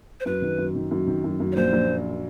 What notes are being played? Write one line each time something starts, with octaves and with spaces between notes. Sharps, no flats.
C5
F#2 B4
D#3
F#2
D#3
F#2
D#3
F#2
F#2
C#5
A#1 C5
A#1